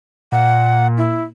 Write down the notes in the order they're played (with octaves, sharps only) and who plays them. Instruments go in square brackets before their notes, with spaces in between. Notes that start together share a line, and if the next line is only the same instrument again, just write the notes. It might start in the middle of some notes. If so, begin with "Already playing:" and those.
[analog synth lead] A#2 [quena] F#5
[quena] E4